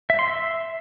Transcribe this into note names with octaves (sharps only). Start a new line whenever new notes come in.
E5
C6
E5